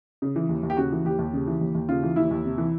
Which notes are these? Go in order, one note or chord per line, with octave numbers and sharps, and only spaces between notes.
C#3
E3
D#2
D#2
G4
C#3 F#4
E3
D#2 G4
D#2
C#3
E3
D#2
D#2
C#3 F4
E3
D#2 E4
D#2
C3
E3